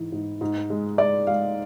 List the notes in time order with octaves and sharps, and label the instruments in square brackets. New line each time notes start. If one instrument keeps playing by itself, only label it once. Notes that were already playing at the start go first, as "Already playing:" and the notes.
Already playing: [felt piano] G#2 E3
G#2
G#2
G#3
G#3 D5
G#3 F5